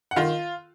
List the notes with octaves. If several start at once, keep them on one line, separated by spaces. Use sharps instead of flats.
F#5
D#3 F4 F5